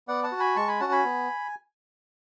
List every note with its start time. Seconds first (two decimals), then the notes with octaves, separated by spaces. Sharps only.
0.08 B3 D5 F#5
0.23 F#5 A5
0.32 F#4
0.40 G#5 B5
0.56 G#3 A5 C#6
0.68 G#5 B5
0.80 C#4 F#4 F#5 A5
0.92 G#5 B5
1.04 B3